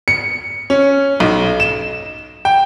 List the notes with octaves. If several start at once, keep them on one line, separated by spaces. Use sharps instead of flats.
C#7
C#4
B1
E7
G5